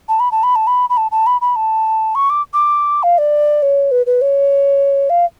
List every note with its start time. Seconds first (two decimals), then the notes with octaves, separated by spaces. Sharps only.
0.09 A5
0.20 B5
0.31 A5
0.43 B5
0.55 A5
0.67 B5
0.90 B5
0.97 A5
1.11 A5
1.26 B5
1.41 B5
1.56 A5
2.15 C#6
2.30 D6
2.53 D6
3.03 F5
3.18 D5
3.62 C#5
3.91 B4
4.06 B4
4.21 C#5
5.10 F5